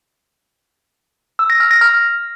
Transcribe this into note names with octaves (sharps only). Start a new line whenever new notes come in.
E6
A#6
F6
A#6
F6